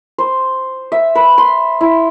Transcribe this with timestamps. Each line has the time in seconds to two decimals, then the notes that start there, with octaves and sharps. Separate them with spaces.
0.18 C5
0.92 E5
1.15 B4
1.38 C6
1.81 E4